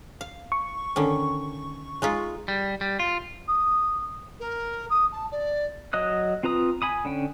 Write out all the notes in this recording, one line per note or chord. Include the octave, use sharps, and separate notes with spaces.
F5
C#6
D3 D#3 C#4
G#3 D#4 F4
G3
G3
F4
D#6
A#4
D#6
A5
D5
F#3 D#5 D#6 F#6
C4 F4 B4 A#5 D#6
G#5 B5 D#6
D3 C#4 G5